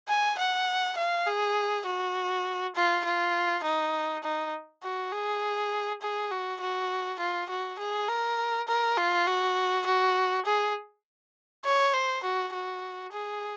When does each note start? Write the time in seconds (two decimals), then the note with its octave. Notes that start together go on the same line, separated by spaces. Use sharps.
0.09 G#5
0.38 F#5
0.97 F5
1.27 G#4
1.86 F#4
2.75 F4
3.05 F4
3.64 D#4
4.23 D#4
4.83 F#4
5.12 G#4
6.01 G#4
6.31 F#4
6.60 F#4
7.19 F4
7.49 F#4
7.79 G#4
8.09 A#4
8.68 A#4
8.97 F4
9.27 F#4
9.86 F#4
10.46 G#4
11.64 C#5
11.94 C5
12.23 F#4
12.53 F#4
13.12 G#4